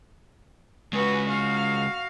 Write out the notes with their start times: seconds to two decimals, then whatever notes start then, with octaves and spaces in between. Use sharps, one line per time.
0.93 C#3 G#3 F#4 B4
1.27 F#4 F5